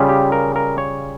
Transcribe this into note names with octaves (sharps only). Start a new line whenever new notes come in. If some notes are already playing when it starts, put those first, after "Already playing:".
Already playing: C#3 G3 C#4 F4
G4
A#4
A#4
C#5